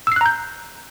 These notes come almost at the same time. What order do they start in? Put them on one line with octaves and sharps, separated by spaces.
E6 C7 F#6 A#5 G6